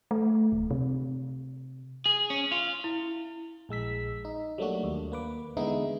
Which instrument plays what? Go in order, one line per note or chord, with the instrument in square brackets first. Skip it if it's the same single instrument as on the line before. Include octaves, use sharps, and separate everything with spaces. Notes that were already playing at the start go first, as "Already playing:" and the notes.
[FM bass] A3
D1
C3
[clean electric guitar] G#4
C#4
F4
[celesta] E4
[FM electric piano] A#1 G#3 E6 B6
D#4
F#3 G3 A3 A#3 D4 F#4
D#2
A#3 B4 D6
D3 E3 G#3 B3 D#4 E4